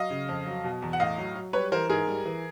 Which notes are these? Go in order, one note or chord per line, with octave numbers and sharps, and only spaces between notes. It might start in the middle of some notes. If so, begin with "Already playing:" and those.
Already playing: F#3 D#5 F5
C#3
F2
F#3
B2
E2
F#5
A2 D#5 F5
F#3
F#3
G3 B4 C#5
E3 A#4 C5
G#2 G#4 A#4
G3
E3